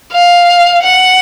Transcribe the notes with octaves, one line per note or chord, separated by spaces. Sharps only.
F5
F#5